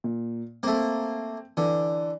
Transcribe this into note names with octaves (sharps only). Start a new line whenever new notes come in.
A#2
A3 A#3 C4
D3 E3